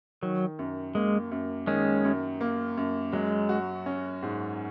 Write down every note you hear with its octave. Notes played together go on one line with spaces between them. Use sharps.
D#3 F#3
F#2
G#3 A#3
F#2
D#3 G#3 C#4
F#2
A#3
F#2
F#3 G#3
F#4
C#4
G#2